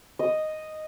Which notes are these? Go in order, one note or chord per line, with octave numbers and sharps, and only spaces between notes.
D#5